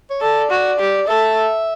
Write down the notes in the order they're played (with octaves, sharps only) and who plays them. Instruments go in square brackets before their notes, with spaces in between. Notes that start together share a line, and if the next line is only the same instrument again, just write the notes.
[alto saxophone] C#5
[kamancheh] A4 [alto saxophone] D5
[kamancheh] F#4
G4
[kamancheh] A4 [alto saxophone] E5